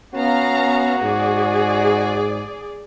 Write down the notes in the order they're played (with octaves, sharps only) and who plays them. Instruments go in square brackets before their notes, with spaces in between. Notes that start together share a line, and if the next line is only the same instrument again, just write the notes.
[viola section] B3 F5 A#5 [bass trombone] C#4 [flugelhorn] F#4
[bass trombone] G#2 [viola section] G#4 D5